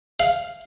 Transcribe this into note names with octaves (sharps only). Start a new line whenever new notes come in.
F5